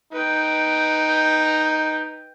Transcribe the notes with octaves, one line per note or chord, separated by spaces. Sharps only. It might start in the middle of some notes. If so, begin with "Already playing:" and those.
D#4 B4 G5